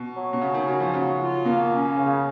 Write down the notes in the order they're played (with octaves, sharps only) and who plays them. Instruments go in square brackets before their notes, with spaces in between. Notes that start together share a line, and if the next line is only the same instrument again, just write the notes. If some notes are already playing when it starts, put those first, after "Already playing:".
Already playing: [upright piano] B2
[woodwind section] F#3
[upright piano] B2
[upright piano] C#3 [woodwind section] C#4
[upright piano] D#3
[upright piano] C#3 [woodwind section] F#4
[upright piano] F3
[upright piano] C#3 [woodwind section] F#3
[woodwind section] F4
[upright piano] B2 [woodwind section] A#3
[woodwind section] C#4
C#3